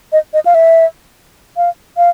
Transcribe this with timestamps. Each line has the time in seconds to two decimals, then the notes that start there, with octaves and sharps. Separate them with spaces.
0.12 D#5
0.34 D#5
0.46 F5
0.54 E5
1.57 F5
1.97 F5